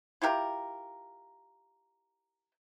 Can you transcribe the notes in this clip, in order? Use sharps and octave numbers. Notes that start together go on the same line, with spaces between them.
E4 F4 G4 A#4